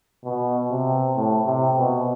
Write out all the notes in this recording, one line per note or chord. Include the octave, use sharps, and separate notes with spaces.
B2
C3
A2
C3
B2